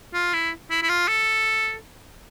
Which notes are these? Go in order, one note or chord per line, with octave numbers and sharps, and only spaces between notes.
F4
E4
E4
E4
F4
A4